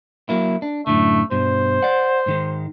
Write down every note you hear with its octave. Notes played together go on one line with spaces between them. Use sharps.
F#3 A#3 E4
D4
F#2 A2 D3 A3
G2 B2 C5
D5 F#5
G#2 D#3 G#3